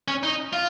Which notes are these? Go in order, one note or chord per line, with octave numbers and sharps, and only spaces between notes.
C#4
D#4
F4